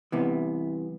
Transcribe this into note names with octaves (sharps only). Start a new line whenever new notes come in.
C2 C3 E3 B3